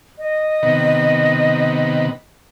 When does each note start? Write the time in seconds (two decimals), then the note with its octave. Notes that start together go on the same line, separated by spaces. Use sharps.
0.18 D#5
0.63 C3 D#3 B3